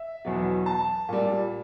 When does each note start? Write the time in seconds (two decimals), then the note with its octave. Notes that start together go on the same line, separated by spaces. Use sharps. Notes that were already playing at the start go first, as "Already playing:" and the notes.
Already playing: E5
0.25 E2 B2 F#3
0.66 A5
1.09 A#2 G3